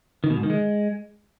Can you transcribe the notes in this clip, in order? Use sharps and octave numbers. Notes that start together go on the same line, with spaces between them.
D#3
B2
G#2
D#3
G#3